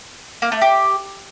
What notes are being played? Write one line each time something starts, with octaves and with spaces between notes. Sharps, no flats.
A#3
A3
G4